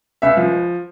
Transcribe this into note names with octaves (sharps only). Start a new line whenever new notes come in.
C#2 E5
F3